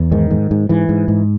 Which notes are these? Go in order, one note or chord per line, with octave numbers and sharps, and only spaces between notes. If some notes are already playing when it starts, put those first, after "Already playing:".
Already playing: E2
G#2 D#3
G#2
G#2
G#2 E3
G#2
G#2